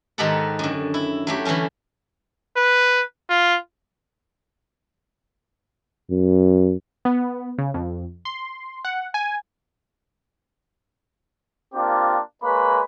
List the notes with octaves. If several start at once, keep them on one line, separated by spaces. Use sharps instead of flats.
G#2 D#3 D#4 G4 A4 F#5
F#2 D3
E4
F#3 A3 G4
D3 E3 G3 A3 C#4
B4
F4
F#2
B3
C#3
F2
C6
F#5
G#5
A#3 C4 D4 F4 G4
G#3 A#3 B4 C#5 B5